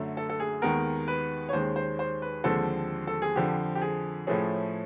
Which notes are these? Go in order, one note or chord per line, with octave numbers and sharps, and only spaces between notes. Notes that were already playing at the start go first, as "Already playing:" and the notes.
Already playing: F#2 D3 F#3 A3
A4
A4
G#4
D#2 D#3 G#3 B3 A#4
B4
C#5
D#2 D#3 G#3 C#4 C5
C5
C5
B4
D#2 D3 F3 G#3 C4 A4
A4
G#4
F2 D3 F3 G4
G4
G#4
A2 F3 A3 C#4 G#4